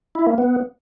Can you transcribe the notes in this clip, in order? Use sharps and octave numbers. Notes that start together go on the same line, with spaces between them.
E4
A#3
B3